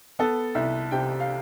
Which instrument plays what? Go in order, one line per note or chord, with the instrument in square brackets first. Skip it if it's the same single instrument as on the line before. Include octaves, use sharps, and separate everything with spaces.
[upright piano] B3 A4
C2 E5
C3 G5
F5